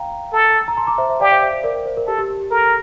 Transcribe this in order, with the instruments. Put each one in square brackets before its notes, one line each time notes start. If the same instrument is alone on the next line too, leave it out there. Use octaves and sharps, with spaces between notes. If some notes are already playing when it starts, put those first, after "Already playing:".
Already playing: [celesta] F5 G5 A#5
[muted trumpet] A4
[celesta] A#5
A5 C6
A#5 D6
C5 E5
C5 E5
[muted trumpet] G4 [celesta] D5 F5
[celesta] C5 E5
C5 E5
C5 E5
A#4 D5
C5
A#4
[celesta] G4 [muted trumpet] A4
[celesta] G4
G4
G4
[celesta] A4 [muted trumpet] A#4